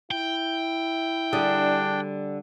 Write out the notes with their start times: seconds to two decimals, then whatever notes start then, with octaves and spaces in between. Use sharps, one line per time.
0.11 E4 G5
1.33 D3 G3 D4 G#4